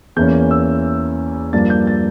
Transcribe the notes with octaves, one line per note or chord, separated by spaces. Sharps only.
E2 E3 A#3 C#4 G6
E6
G2 F3 A#3 D4 A6
G6
A6